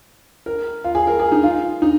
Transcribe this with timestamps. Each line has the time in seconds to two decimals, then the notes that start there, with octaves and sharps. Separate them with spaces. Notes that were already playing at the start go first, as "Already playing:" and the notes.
0.46 A#4
0.84 F4
0.95 G#4
1.07 A#4
1.20 G#4
1.32 D#4
1.43 F4
1.82 D#4